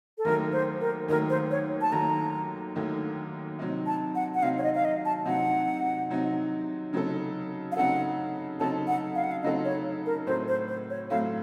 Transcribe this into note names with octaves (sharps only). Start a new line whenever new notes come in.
A4
D#2 D#3 F#3 A3 A#4
C5
A#4
D#2 D#3 F#3 A3 A#4
C5
C#5
A5
D#2 D#3 F#3 A3 A#5
D#2 D#3 F#3 A3
C3 F#3 C4 D#4
A5
F#5
F#5
C3 F#3 C4 D#4 F5
C#5
D#5
F5
D#5
A5
C3 F#3 C4 D#4 F#5
C3 F#3 C4 D#4
C#3 F#3 C4 D#4 A4
F5
C#3 F#3 C4 D#4 A4 F#5
C#3 F#3 C4 D#4 A4 A5
F#5
F5
F#5
F5
C#3 F#3 C4 D#4 A4 D#5
C#5
A#4
A2 F#3 A3 C4 C5
C5
C5
C#5
A2 F#3 A3 C4 F5